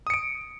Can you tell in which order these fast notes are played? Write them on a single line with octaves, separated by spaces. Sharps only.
D#6 C#7 D7